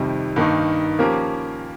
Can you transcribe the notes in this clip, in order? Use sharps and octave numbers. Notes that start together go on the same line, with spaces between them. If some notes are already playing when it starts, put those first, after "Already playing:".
Already playing: F2 C3 D#3 G3
G2 D#3 A#3 D#4
F3 A#3 C#4 G4 A#4